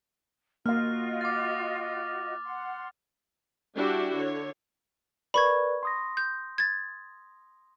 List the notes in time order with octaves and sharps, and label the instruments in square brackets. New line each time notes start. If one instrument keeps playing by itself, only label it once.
[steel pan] A#3 F5 [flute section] F4 F#4 D#5 [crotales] F6
[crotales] D6 A6
[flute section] F#5 C6
[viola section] G3 D4 E4 F#4 G4
D3 C#5
[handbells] A#4 B4 D5 [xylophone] B5 C#6 G#6
[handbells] C6 D#6 A#6
[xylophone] G6
G#6 A6